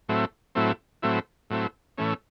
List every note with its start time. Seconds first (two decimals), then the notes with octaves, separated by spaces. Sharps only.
0.09 A2 F#3 A3 C4 E4
0.55 A2 F#3 A3 C4 E4
1.02 A2 F#3 A3 C4 E4
1.50 A2 F#3 A3 C4 E4
1.98 A2 E3 A3 C#4